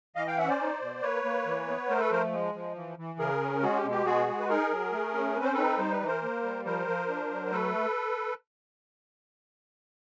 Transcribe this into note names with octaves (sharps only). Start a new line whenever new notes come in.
E3 D#5 F5
F5 G5
C#4 E5 F#5
C5 D5
D#4
B2
A#3 B4 C#5
A#3
E3
B3
A3 A#4 C5
A4 B4
F3 A#4 C5
G#3
F3
E3
E3
C#3 G#4 A#4
C#4
G#3 F#4 G#4
G4
B2
G4
G#3 F#4 G#4
G#3
B4
D#4 G#4 A#4
F#3
A3
C#4
C4 B4
C5
D#4 A4 B4
G3 C5
B4
E3
A#4 C5
A#3
G3
F3 A#4 C5
F3
D4
F#3
A3 A4 B4